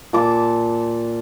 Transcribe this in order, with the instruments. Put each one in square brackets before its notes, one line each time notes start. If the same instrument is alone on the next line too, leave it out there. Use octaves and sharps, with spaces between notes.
[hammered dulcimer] A#2 A5 D6